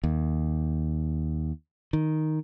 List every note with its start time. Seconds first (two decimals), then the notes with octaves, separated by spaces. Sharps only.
0.04 D#2
1.93 D#3